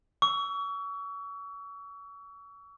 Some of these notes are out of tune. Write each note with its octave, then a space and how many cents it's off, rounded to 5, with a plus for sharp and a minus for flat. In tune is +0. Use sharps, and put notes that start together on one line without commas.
C#6 +35 E6 +0